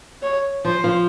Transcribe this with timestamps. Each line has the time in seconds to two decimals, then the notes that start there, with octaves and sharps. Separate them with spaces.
0.22 C#5
0.65 F3 C5
0.84 F3